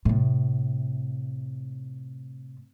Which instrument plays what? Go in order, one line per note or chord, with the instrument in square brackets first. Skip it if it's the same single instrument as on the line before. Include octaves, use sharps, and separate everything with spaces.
[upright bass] A2 C3